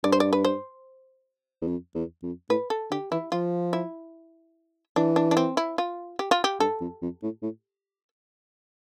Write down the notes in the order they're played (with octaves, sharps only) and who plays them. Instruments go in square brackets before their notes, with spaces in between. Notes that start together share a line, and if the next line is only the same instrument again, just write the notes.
[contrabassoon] G2 [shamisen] D5
[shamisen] C5
D5
B4
C5
[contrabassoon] E2
F2
E2
F2
[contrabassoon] A2 [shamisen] B4
[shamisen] A4
[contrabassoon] D3 [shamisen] G4
[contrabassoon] E3 [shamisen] E4
[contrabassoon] F3 [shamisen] F4
[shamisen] E4
[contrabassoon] E3 [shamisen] D4
[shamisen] D4
D4
C4
E4
F4
G4
F4
G4
[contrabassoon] G2 [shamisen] A4
[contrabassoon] F2
F2
A2
A2